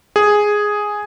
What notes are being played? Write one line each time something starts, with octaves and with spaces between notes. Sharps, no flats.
G#4